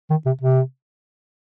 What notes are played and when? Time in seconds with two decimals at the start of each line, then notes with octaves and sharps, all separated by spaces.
0.10 D#3
0.26 C3
0.41 C3